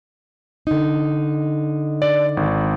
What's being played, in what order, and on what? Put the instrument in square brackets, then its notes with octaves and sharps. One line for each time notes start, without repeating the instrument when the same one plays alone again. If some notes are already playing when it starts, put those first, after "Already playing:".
[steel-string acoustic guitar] D3 D#4
[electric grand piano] D5
G#1